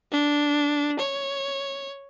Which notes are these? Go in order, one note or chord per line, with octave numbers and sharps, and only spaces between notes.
D4
C#5